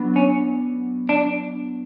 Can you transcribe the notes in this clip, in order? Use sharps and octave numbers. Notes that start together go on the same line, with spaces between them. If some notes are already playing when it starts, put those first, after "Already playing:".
Already playing: F#3 B3 D4
C#4
D4